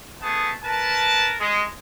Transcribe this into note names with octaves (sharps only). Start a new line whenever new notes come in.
A3 B3 G#4 A5 D#6
A#4 B4 A5
G#3